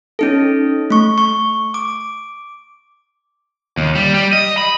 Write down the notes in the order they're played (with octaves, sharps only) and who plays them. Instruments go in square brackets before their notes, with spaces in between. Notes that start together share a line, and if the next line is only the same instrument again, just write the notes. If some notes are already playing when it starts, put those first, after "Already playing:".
[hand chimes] C#4 D#4 A4
A3 C#6
C#6
D6
[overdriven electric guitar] D#2
G3
G3
D#5
B5